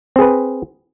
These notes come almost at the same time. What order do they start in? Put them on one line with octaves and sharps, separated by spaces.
C4 G#4 B4